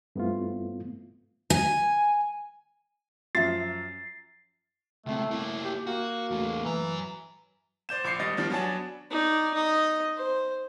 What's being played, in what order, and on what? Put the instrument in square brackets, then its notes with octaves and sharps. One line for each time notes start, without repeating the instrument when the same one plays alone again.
[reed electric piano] G2 A3 B3 C4 E4 F4
[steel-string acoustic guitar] G#5
[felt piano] F#2 F3 [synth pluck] F4 E5 [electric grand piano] A6 [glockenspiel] C7
[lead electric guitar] C#2 C3 [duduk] A3
[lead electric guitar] A#3 E4
[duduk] G4
[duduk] A#3 [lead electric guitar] F#4
[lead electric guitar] E2 A3
[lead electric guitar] F#2 A#5 [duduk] E3
[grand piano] C5 D5 G6 E7
A#1 D6 G6 C7 C#7
G#1 G3 D#5 A6
D#3 F3 G3 D4
F#3 B3 D4 G#5 A5
[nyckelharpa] D#4 D5
D#4 D#5
C5